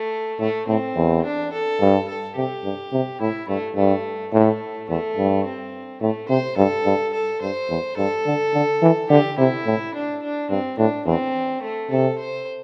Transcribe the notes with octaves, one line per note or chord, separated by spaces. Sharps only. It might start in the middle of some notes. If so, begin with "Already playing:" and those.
Already playing: A3
A2 A3
A2 C4
E2
D4
A4
G2
A4
C3 G4
G2
C3
A2 E4
G2 A3
G2 A3
A2 A3
E2 A3
G2
C4
A2 A3
C3 C5
G2 A4
G2
A4
G2 C5
E2
G2 A4
D3
D3
E3
D3 G4
C3 E4
A2
D4
D4
G2 C4
A2 D4
E2 C4
A3
C3 A4
C5